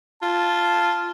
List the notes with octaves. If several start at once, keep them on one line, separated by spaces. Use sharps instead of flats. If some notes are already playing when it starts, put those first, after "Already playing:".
F4 A5